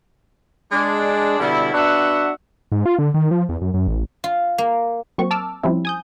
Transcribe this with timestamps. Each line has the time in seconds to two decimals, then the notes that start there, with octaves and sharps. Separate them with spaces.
0.72 G#3 D4
1.40 B2 D3 G3 E4
1.74 B3 D4 F#4 E5 F#5
2.72 G#2
2.86 F4
2.99 D3
3.14 D#3
3.31 F3
3.49 E2
3.62 F#2
3.74 F#2
3.88 A1
4.24 F4
4.58 A#3
5.18 F#3 A#3 C4 C#6
5.31 A5 D6 E6 F6
5.63 F3 G3 C4 C#4 E4
5.85 G#5 D#6 G6